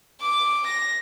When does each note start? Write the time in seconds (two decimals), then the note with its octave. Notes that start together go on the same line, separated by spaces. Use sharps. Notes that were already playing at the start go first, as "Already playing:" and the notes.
0.21 D6
0.67 A#6